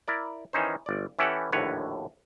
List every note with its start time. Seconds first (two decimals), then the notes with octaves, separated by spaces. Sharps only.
0.08 E4 A#4 D5
0.53 D#3 E3 C#4 D#4 C5
0.86 G1 D5
1.19 E3 C#4 E4 G4 A4 F#5
1.52 A#1 D#2 A2 D3 B4 C#5